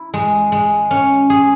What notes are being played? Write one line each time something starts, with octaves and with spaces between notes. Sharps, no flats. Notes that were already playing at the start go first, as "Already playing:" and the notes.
Already playing: E4
G#3
G#3
C#4
G#4